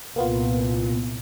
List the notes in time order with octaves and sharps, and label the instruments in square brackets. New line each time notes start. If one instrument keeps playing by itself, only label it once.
[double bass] C2 A#2 [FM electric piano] A#3 B3 F4